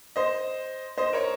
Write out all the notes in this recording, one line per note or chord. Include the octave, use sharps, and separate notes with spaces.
C5 D#5
C5 D#5
A#4 C#5